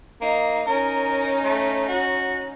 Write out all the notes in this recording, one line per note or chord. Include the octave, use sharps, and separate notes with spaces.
A#3 D#4
C#4 D#4 A#4
A3
F#4